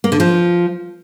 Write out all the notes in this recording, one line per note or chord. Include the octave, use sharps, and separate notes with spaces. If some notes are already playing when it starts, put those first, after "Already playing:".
A#3
D3
F3